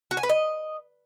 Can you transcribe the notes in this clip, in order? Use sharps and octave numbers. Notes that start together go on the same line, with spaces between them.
F#4
G#5
B4
D#5